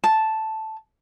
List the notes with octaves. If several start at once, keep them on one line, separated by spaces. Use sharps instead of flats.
A5